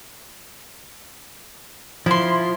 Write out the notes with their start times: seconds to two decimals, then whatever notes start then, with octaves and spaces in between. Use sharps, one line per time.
2.06 F3 E4 C6